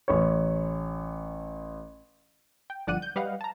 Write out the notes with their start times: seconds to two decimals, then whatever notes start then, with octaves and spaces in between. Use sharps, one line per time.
0.08 A1 C#5
2.70 G5
2.87 G1 F3 D5 F#5 F#6 D#7
3.02 G6
3.16 G3 B4 D#5 F5 F#5
3.41 A5 A#5